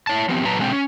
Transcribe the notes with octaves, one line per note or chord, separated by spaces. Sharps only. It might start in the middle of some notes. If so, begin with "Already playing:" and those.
E4 C#5 A5
F3 B3 C4 G4
A#2 F#3 B4 A5 A#5
B2 D3 G#3 C4 B4 G5
C#4